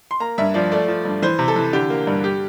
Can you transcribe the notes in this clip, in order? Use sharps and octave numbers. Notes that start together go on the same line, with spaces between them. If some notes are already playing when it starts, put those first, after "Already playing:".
C6
A#3 A#5
G2 E5
F3 D5
A3 D5
F3
G2
E3 C5
C3
A4
E3
D3 G4
A#3
G2
G4